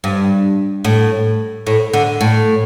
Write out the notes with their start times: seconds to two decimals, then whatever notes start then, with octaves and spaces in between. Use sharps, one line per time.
0.04 G2
0.85 A2
1.67 A2
1.93 D3
2.21 A2